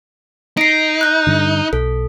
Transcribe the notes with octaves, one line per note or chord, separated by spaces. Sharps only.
D#4 C7 D7
F#6 G6
G2 D3
B1 A4